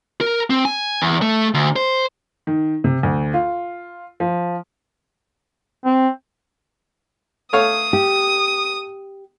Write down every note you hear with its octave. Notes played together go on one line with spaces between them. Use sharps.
A#4
C4
G#5
E2
A3
D2
C5
D#3
C3
D2
F4
F3
C4
A3 C#5 F5 D#6
G4